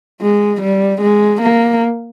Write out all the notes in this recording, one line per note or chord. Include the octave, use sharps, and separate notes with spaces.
G#3
G3
G#3
A#3